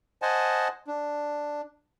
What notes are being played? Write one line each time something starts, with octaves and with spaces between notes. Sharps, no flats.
C5 D#5 F#5 G#5 A5
D4